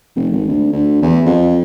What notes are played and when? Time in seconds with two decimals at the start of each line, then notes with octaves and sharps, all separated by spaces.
0.16 F1
0.31 G#1
0.48 D2
0.72 D2
1.02 E2
1.26 F2